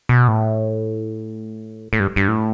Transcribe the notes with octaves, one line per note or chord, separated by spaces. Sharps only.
B2
A2
A2
G2
G2
A2